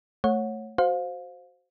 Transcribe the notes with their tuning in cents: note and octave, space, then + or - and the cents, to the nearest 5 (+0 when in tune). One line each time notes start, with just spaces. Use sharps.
A3 +0 C#5 -15 F#5 -20
F#4 +5 C5 +0 F5 +25